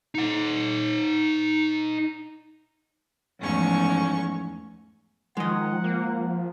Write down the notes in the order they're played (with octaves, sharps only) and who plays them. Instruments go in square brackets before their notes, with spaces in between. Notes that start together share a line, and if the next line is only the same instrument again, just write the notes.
[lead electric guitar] D#4 F#5
[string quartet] E2 G#2 F3 A3 C#4 C#6
[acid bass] D#3 [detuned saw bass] F3 [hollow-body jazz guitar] G#3 D#5 [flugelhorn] F#5
[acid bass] A#3